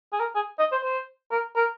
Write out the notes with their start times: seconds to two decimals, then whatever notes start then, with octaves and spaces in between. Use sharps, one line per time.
0.13 G#4
0.20 A#4
0.36 G#4
0.59 D#5
0.72 C5
0.84 C5
1.32 A#4
1.56 A#4